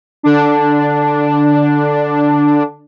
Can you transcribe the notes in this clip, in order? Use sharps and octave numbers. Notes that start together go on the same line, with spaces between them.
D3 D4